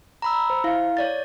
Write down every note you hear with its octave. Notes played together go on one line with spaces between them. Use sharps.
A#5 B5 E6
C5
E4 F5
C#5 D5 A6